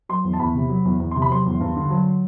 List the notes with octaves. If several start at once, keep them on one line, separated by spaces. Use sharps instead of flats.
F#3 C6
E2
A5
E2 B5
C3
F#3
E2
E2
C3 C6
B5
F#3 C6
E2
G2
D3
F#3